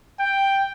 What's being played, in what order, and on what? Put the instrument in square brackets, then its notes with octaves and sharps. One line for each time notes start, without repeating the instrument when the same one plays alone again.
[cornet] G5